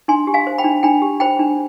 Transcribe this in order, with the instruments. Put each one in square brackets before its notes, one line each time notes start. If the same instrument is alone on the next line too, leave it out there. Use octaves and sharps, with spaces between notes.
[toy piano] D4 G#5 C6
G4
F5 G#5
C5
G5 B5
D4
D4 G5 B5
G4
C5 G5 B5
D4